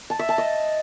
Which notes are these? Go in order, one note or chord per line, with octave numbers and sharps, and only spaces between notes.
A5
E5
A5
D#5